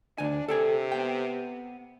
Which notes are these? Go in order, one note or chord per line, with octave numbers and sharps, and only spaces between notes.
D2 D4 G#5
C3 A4 G5 G#5
B3 G5